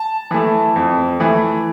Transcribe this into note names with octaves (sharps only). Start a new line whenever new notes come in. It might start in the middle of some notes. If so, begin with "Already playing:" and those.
Already playing: A5
E3 A3
F2
E3 A3